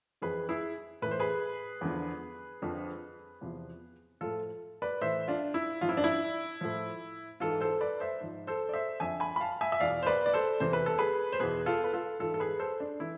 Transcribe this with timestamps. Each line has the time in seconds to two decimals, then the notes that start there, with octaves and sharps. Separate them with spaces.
0.22 F2 E3 G#4 B4
0.49 E4 G#4
1.02 A2 E3 B4
1.11 C5
1.20 G#4 B4
1.81 E2 D3 F3
2.62 F2 D3 F3
3.41 E2 C3 F3
4.21 A2 F3 F4 A4
4.82 B4 D5
5.01 A2 E3 C5 E5
5.28 D4 F4
5.54 E4
5.81 G#2 F3 F4
5.89 E4
5.97 D4
6.04 E4
6.61 A2 F3
7.40 G#2 E3 F4 A4
7.60 A4 C5
7.81 B4 D5
8.00 C5 E5
8.20 G#2 F3
8.47 A4 C5
8.69 D5
8.74 C5 E5
9.00 F2 D3 F3 E5 G#5
9.20 G#5 B5
9.36 B5
9.40 F5 A5
9.61 E5 G#5
9.72 E5
9.80 E2 B2 D5 F5
10.03 C5
10.06 B4 D5
10.26 D5
10.33 A4 C5
10.60 E2 C3 E3 C5
10.73 B4
10.86 A4
10.98 G#4 B4
11.32 C5
11.40 E2 B2 G#4 B4
11.66 F4 A4
11.84 B4
11.93 F4 A4
12.20 G#2 E3 F4 A4
12.34 A4
12.40 G#4 B4
12.59 A4 C5
12.80 D4
13.00 E3 E4